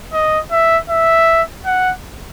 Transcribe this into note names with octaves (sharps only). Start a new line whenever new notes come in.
D#5
E5
E5
F#5